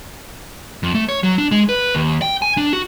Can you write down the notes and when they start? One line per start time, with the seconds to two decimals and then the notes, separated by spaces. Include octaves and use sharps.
0.83 F2
0.95 A3
1.09 C#5
1.23 F#3
1.38 D4
1.52 G#3
1.69 B4
1.95 D#2
2.22 G5
2.42 G#5
2.57 D4
2.73 F#4